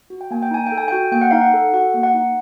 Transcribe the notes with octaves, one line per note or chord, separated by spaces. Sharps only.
F#4
G5
A#3 G#5
G5
D#4 G#5
G5
A4
G#5
F#4 G5
A#3 G5
F#5
D#4 F5
F#5
A4
F#4 F#5
A#3
F#5
D#4